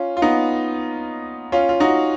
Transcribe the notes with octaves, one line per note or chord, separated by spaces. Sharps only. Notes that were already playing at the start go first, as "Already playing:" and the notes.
Already playing: C#4 F4
F4
B3 D#4
C#4 F4
F4
D#4 F#4